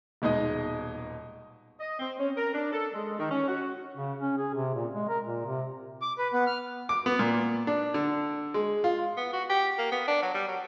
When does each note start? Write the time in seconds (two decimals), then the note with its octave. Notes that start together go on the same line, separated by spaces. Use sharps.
0.22 D#1 B2 G#3 D#4 D#5
1.80 D#5
1.99 C4
2.19 C#4
2.38 A#4
2.54 D4
2.73 A4
2.94 G#3
3.19 D#3
3.31 C#4
3.48 F#4
3.97 C#3
4.21 C#4
4.38 G#4
4.54 C3
4.75 A#2
4.94 G#3
5.09 A#4
5.26 A#2
5.46 C3
6.02 D6
6.18 B4
6.33 B3
6.47 F6
6.89 D6
7.06 B3
7.19 A#2
7.67 D4
7.94 D3
8.54 G#3
8.84 F4
9.17 B3
9.33 F#4
9.49 G4
9.78 A#3
9.92 B3
10.08 D4
10.22 F#3
10.34 G3
10.48 F#3